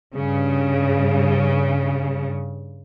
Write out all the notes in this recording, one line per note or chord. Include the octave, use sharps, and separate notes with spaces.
G2 C#3